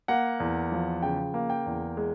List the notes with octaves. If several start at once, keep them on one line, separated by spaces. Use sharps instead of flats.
A#3 F#5
E2
F3
C#3 G5
A#3
G5
E2
G#3